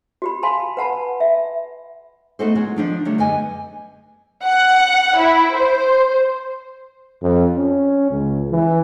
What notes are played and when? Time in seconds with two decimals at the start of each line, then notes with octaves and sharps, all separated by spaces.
0.22 F#4 G4 B5
0.43 F5 G#5 A5 B5 C6
0.77 B4 F#5 A5 B5
1.20 E5
2.39 A3 B3 D#4 F#4 A4 C5
2.55 F#3 G#3 F4 F#4
2.76 D#3 F3 D4 D#4
3.05 D3 F#3 G3 A3
3.18 F#2 D3 B3 G4 D#5 G#5
4.45 F#5
5.20 E4
5.58 C5
7.22 F2
7.57 C#4
8.11 C#2
8.51 E3